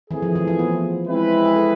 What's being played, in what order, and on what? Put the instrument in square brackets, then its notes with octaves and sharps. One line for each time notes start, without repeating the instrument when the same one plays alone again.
[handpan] E3 [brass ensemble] A3 C4 G#4
[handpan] F3
E3
F3
B3
[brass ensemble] G#3 C4 E4 B4
[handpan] G#4
A4